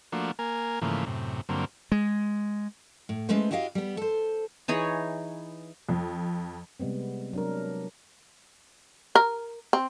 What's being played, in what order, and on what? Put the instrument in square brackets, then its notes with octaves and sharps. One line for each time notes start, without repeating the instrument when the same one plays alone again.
[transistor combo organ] F3 A3 A#3 D4 F#4
A#3 A#4 G#5
G#2 C#3 E3 F3 A3 A#3
F#2 A2 C3
G2 D3 F#3 A#3 C4
[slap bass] G#3
[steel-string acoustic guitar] A2
G#3 A3 C#4 B4 C5
E4 F#4 G4 D#5 F5
G3 B3
A4 C5
[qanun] E3 D#4 G#4 C#5
[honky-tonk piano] F2
[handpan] C3 G3 G#3 B3 C4
F#3 D4 A#4
[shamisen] A#4
C4